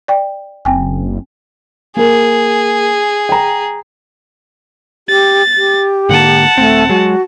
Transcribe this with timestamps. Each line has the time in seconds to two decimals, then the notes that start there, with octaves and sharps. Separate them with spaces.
0.08 D5 G5
0.65 F#1 C4 G5 G#5
1.97 A#3 G#4 A#4
3.29 G5 A#5
5.09 G4 A6
5.57 G4
6.09 G#2 D3 A#3 F#5 A5
6.58 D#1 A3 C4
6.89 F#3 G#3 F#4